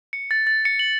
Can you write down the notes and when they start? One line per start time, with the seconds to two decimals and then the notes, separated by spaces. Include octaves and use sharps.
0.13 C#7
0.31 A6
0.47 A6
0.65 C#7
0.79 F#7